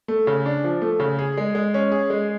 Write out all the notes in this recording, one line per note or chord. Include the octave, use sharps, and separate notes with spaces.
A3
C#3
D4
F3
A3
C#3
G#4
G#3
G#3
C#4
G#4
G#3